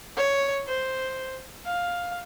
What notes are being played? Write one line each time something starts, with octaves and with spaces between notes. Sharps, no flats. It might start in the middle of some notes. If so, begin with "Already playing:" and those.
C#5
C5
F5